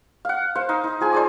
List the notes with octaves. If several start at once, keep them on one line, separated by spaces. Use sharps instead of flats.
F5 F#5
C5 F5
D#4
D#4
F3 G#4 G#5
C5 D5 D6